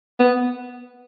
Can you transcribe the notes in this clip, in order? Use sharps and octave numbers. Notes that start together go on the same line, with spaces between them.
B3